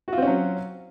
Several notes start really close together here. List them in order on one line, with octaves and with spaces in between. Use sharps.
F#4 F4 C4 C#4 F#3